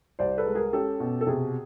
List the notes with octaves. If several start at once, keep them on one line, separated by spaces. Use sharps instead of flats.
C2 C5 D5
A4 B4
G#3
G#4 A#4
C#4 G4 A4
B2
A4
C3 G#4